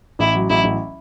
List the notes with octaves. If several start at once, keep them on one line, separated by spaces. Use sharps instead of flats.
A1 E4
F#3
A1 E4
A1